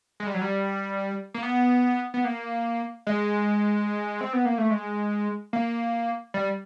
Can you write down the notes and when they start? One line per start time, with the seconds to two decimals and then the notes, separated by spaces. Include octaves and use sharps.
0.20 G#3
0.27 G3
0.34 F#3
0.41 G3
1.34 A#3
1.43 B3
2.14 B3
2.24 A#3
3.07 G#3
4.21 C4
4.33 B3
4.45 A#3
4.58 A3
4.71 G#3
5.53 A#3
6.34 G3